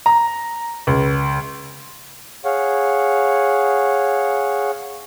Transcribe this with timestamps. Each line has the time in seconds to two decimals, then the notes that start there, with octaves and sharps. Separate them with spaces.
0.06 A#5
0.87 C#2
2.45 G#4 C#5 F5 F#5